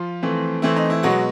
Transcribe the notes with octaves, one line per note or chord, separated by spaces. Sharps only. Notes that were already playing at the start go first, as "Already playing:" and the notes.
Already playing: F3 F4
E3 A3 C4
E3 A3 C4 E4
D#4
E4
B2 F#3 G#3 B3 F#4